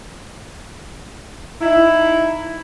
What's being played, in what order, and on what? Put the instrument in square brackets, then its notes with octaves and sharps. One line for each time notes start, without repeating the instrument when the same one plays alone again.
[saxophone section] D#4 E4